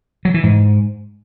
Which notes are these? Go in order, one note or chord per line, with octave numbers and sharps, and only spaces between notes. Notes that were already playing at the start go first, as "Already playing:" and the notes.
F#3
E3
G#2